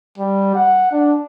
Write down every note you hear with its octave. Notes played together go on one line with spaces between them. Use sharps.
G3
F#5
D4